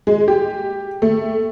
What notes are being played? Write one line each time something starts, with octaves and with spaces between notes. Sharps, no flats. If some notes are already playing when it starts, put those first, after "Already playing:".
G#3
G4
A3